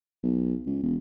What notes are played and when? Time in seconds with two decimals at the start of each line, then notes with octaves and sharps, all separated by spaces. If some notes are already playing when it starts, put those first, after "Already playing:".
0.23 B1
0.66 C#2
0.83 E1